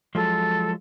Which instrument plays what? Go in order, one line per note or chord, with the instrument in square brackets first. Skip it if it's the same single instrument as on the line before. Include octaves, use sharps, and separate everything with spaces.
[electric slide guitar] F3 F#3 G#3 [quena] A4